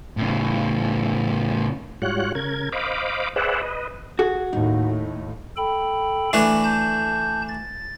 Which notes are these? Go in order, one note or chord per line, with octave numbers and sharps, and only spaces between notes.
A2 C#3
G#2 G3 F4 F#4 C#5 F#6
C#3 A#4 G#6
C5 D#5 F5 B5 D6
G#4 B4 C5 D5 E5 F#5
B4 D#5
F#4 G#4
D#2 A2 D#4
A4 G5 B5
E3 A3 D4
A5 G6
A6